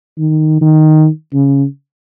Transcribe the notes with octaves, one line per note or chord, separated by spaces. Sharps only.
D#3
D#3
C#3